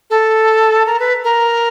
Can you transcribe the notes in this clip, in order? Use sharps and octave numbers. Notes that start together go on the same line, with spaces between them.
A4
A#4
B4
A#4